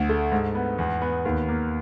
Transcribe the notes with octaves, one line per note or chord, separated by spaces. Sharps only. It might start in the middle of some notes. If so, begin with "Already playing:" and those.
Already playing: D2
A3
G#2
B3
E2
B3
D#2
A#3